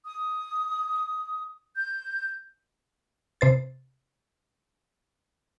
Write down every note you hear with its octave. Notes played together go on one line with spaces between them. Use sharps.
D#6
G6
C3 C5 A6